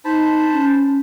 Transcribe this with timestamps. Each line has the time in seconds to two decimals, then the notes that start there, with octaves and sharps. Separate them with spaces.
0.05 D#4 C5 A5 B5
0.53 C#4